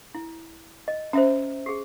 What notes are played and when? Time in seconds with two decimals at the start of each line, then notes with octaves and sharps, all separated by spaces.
0.15 E4
0.88 D#5
1.13 C#4 C5 E5 A#5
1.66 G4 G#4